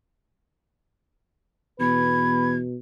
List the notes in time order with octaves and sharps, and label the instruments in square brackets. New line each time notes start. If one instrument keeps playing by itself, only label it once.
[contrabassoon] E2 [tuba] B2 [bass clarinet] B4 [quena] G#6